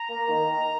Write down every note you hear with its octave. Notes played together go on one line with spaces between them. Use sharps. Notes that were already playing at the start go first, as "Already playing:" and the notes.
Already playing: A#5
A#3
D#3